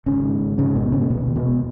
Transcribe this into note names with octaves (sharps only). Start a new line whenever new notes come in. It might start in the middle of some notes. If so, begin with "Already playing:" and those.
G#1 C#3 C#4
G#2
G#1
G#2 C#3 C#4
G#1 B2 B3
G#2 C#3 C#4
A#3
D#2 B2 B3
D#2
B2 B3
E1